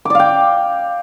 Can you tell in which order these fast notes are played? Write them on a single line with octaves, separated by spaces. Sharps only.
D6 D5 F5 G5